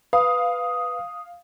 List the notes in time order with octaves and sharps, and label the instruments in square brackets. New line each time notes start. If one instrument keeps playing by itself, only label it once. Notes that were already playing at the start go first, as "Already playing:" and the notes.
[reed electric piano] B4 [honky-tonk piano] F5 [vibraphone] D#6